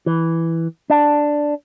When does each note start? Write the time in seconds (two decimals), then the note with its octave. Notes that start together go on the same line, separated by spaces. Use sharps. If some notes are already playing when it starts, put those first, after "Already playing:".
0.06 E3
0.90 D4